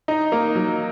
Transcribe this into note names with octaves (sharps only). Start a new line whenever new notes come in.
D#4
A#3
F#3